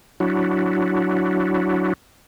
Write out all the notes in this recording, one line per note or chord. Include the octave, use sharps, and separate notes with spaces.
F#3 D4 E4 F#4